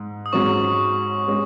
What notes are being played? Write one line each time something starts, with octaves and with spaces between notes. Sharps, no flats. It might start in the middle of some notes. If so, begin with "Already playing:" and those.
Already playing: G#2
D#6
G#2 F#3 C#4 C#6
G#3 C#4